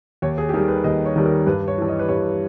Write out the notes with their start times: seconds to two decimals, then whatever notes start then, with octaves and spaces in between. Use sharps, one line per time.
0.22 D#2 C#5
0.38 G#4
0.49 G4
0.54 D#3 G3 G#4
0.68 B4
0.84 D#2 D#5
1.06 C#5
1.16 D#3 G3
1.26 A#4
1.47 G2 B4
1.68 C#5
1.78 E3 G3
1.88 D#5
1.99 B4
2.09 G2 C#5